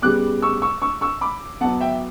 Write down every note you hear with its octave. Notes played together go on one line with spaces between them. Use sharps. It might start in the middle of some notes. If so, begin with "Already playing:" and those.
C#3 G3 B3 D6 F#6
C#6 E6
C#6 E6
C#6 E6
C#6 E6
B5 D6
B2 F#3 B3 F#5 A5
E5 G5